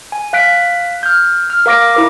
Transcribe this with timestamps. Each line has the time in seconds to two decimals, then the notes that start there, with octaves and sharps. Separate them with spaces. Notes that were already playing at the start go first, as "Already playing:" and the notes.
0.12 G#5
0.33 F5 F#6 B6 D7
1.03 F6 G6
1.50 F6
1.66 A#4 F5 D6 A#6 D7
1.95 E4 A#4 D6